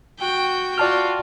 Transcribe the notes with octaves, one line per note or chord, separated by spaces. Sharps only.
F#4 G5
F4 F#4 D5 A5 F6